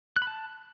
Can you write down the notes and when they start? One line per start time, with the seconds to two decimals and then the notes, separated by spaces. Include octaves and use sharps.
0.16 F#6
0.22 B5
0.27 A5